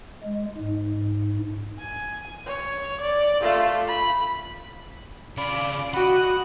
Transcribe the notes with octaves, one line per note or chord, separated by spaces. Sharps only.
G#3
G#2
G#5
C#5
D5
A3 F4
B5
C#3 F4 D5 B5
F#4 D#5 B5